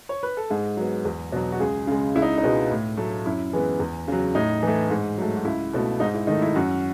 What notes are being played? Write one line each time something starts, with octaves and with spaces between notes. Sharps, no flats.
C#5
B4
A4
G#2 G#4
F#3 B3
E2
B2 F#3
F#4
C#2 G#4
C#3 G#3
C#2 E4
D#4
D#4
B2 G#3 B3
A2
F#3 A3
F#2 E4
E3 G#3 B3
E2
C#3 F#3
A2 D#4
E3 A3
G#2
F#3 A3
F#4
C#2 E4
B2 A3
G#2 D#4
E4
D#3 A3 D#4
E4
F#2 F#4